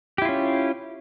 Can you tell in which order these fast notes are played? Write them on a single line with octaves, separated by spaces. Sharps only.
G4 E4 F4 C#4